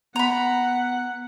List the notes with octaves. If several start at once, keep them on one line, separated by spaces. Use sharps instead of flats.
B3 F#5 A#5 B5